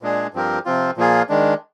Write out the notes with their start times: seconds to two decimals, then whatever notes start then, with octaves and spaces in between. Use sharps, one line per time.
0.02 A#2 G#3 D4 G#4
0.34 G2 F3 C4 G4 A#4
0.65 C3 F3 C4 F4
0.97 A#2 F3 A#3 F4 G#4
1.29 D#3 G#3 D4